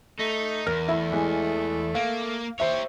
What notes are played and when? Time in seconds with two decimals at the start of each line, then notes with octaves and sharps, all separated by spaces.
0.19 A3 D#4
0.66 E2 A#4 F6 A#6
0.88 A3 E4
1.12 E3 G#3
1.95 A#3 F5
2.60 G4 C5 C#5 E5